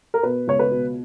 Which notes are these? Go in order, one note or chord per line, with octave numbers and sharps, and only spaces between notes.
A#4
B2 B4
C#2 C#5
B4
B2